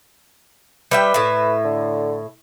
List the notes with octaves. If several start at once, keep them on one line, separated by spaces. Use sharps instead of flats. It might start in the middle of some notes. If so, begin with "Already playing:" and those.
G3 B4 E5 G5
A2 E5
D3